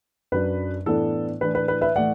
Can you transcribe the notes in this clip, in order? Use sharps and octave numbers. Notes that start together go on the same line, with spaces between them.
F#2 F#3 D4 B4
A2 E3 B3 D4 A4
A2 E3 D4 B4
B4
B4
B4 E5
A2 E3 A3 D5 F#5